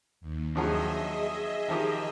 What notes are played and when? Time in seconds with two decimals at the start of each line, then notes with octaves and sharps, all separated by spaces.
0.21 D#2
0.55 G2 F3 F#3 G#4 D#5 E5
1.68 D#3 F3 G4